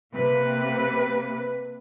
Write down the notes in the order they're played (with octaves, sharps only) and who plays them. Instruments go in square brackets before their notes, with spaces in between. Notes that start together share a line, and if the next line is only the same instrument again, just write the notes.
[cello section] C3 A#3 B4